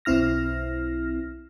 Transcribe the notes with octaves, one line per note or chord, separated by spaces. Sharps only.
B1 C4 E4 F6 A#6